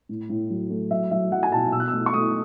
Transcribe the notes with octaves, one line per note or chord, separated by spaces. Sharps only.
A2
A2
F#3
A3
F#3 E5
F#3 E5
F#3 F#5
G#5
B2 A5
B2 E6
F#6
E6
A3
C#6
A3 D#6